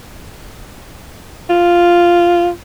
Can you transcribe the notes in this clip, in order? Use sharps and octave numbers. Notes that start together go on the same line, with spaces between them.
F4